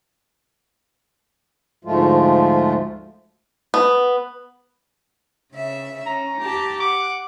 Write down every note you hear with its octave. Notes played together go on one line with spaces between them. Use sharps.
D2 G#2 F3 G#3 A3 F4
B3
C#3 E5
C#4 A#5
G4 A5
F#5 D6